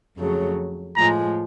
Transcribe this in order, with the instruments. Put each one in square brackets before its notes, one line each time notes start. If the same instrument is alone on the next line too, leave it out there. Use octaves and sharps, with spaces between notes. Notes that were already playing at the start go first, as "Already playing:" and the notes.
[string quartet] F2 C#3 F#3 A3
[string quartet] A2 F3 G#3 [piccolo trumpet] A#5